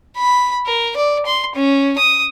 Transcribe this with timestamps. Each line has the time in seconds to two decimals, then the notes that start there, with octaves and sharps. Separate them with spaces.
0.16 B5
0.66 A#4
0.96 D5
1.26 C6
1.55 C#4
1.98 D#6